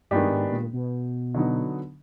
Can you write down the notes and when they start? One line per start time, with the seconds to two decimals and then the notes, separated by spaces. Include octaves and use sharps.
0.11 G2 D#3 G#3 B3 D4 G4
0.31 G#2
0.51 A#2
0.73 B2
1.35 D3 F#3 B3 D#4